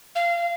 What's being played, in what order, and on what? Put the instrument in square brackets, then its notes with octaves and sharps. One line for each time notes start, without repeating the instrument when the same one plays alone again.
[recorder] F5